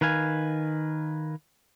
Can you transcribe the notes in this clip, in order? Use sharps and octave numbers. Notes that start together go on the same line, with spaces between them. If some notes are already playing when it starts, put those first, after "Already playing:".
D#3 B4 F5 G#5